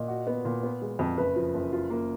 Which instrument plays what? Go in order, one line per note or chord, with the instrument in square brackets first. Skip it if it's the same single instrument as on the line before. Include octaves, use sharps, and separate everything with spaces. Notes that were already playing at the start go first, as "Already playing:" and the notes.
Already playing: [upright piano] A#2 [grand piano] D#5
[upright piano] F#4
B3
A#2
B3
G#3
F2
[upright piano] F#1 [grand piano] B4
[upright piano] F3
F#1
F4
A#3